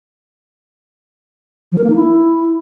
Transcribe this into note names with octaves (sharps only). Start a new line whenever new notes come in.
F3
A#4
A#3
D#4
E4